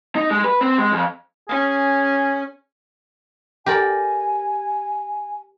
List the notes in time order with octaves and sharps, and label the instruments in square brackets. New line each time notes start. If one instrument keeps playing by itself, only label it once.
[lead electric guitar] D#4
G#3
B4
C4
G#3
F2
[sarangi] C#4 [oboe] G#4
[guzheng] G4 A#4 D5 [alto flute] G#5